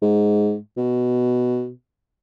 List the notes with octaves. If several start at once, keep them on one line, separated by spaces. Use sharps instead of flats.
G#2
B2